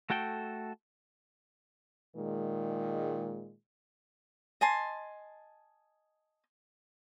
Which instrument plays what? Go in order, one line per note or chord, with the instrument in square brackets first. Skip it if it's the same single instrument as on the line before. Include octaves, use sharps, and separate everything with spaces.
[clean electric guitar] A3 F#4 A4 G5
[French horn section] A#2 D#3 G#3
[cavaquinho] D#5 G#5 A5 C6